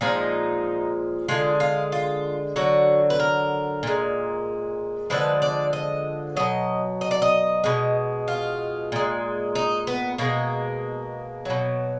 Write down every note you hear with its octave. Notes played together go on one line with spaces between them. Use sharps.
A#2 F3 G#3 D#4
D3 G#3 F4
F4
F4
D3 F#3 F#4
B4
A#4
A#2 G#3
D3 F3 G#3 B4
D5
D#5
B2 F#3 D#5
D#5
D5
D#5
B2 G#3
F4
A#2 G#3
D#4
B3
B2 G#3 A#3
B2 F#3